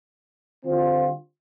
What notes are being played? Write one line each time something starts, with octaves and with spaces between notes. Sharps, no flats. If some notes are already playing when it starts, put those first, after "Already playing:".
D3 G3 C4 F4